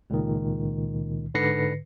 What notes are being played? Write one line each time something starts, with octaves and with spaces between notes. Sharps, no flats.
C#2 A#2 D#3
G#2 D3 B4 A#6 C7 C#7